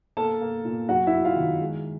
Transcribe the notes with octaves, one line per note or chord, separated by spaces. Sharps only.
A#3 A4 A5
A#3
A#2
F#2 F#4 F#5
E4 E5
F#3
F4 F5
D#3
G#3